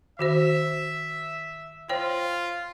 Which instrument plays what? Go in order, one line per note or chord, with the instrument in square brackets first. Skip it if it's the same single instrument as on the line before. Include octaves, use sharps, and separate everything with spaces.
[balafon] D#3 F#4 C5 [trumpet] E5
[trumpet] F4 [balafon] C5 C#5 G5